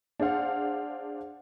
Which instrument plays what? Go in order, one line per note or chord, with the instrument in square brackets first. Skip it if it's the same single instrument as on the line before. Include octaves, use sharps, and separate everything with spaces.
[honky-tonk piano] D4 G#4 C5 F5 F#5